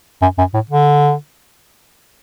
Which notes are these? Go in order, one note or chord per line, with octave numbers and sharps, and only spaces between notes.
F#2
F#2
A2
D3